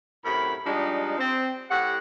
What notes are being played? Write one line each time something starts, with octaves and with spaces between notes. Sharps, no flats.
F#2 A2 C3 A#4 B5
F3 G3 G#3 D4 D#4
C4
A2 G4 F#5